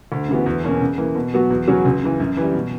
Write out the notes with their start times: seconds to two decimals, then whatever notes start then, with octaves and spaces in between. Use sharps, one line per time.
0.12 D2
0.28 C#3 E3 B3 F#4
0.46 E2
0.64 B2 A#3 C#4
0.81 C#3
0.98 E3 A#3
1.15 B2
1.34 F#3 B3 F#4
1.50 E2
1.68 C#3 F#3 C#4 F#4
1.85 C#2
2.02 C#3 E3
2.20 F#2
2.37 E3 G3
2.54 B2